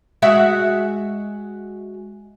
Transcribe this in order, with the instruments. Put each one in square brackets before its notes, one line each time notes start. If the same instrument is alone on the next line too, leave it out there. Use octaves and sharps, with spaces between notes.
[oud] G#3 F#4 E5